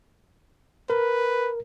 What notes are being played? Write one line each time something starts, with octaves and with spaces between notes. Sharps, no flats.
A#4 B4